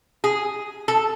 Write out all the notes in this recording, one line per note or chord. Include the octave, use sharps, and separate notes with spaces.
G#4
A4